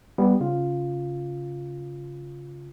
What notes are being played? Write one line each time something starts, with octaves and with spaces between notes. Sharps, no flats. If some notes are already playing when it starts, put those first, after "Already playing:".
G3 B3
C#3 F4